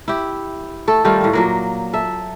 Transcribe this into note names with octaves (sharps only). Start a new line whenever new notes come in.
E4 G4
A3 A4
D#3 G3 A3 F4
A2 F4
A#2 F#3 A#3
A4 E5